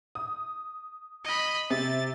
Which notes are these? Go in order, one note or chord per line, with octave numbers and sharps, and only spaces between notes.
D#6
D#5 B5
C3 A6